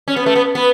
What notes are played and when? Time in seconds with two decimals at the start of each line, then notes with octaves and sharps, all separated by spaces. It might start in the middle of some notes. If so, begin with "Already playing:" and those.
0.08 C#4
0.16 B3
0.26 A3
0.36 B3
0.55 B3